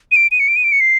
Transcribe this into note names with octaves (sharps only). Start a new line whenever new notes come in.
D#7
D7
D#7
C#7
D7
D#7
D7
C#7
C7